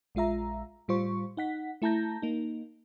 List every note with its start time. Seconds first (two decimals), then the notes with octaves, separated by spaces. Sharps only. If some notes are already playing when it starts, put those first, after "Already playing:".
0.15 A#1 G#3 F4 E5 A#5
0.88 A2 G3 F4 C5 C#6
1.37 D#4 F#5 B6
1.82 A3 E4 A5 A#5 G6 A#6
2.22 A#3 D#4